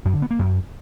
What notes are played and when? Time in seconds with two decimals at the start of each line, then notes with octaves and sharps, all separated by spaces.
0.05 F#2
0.14 D3
0.22 B3
0.31 A#3
0.39 F#2